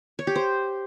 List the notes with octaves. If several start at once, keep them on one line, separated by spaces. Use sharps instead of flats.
C#5
G4
C5